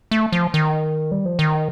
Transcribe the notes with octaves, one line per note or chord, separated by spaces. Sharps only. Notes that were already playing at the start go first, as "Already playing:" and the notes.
A3
F3
D#3
G3
F3
D#3